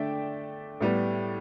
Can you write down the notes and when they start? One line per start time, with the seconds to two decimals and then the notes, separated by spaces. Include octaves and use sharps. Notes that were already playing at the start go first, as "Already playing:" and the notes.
Already playing: D3 A3 D4 D5 E5 G5
0.81 A2 G3 B3